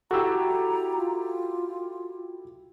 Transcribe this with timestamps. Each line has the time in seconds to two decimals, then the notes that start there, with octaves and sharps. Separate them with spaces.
0.11 E4 F#4 G4 A4 A#5 E6
0.97 F4